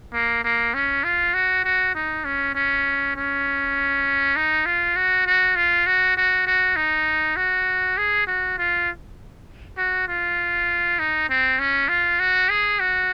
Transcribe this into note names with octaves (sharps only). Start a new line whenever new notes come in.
A#3
A#3
C#4
F4
F#4
F#4
D#4
C#4
C#4
C#4
D#4
F4
F#4
F#4
F4
F#4
F#4
F#4
D#4
F#4
G#4
F#4
F4
F#4
F4
D#4
C4
C#4
F4
F#4
G#4
F#4